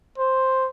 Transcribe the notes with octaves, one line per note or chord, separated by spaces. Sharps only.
C5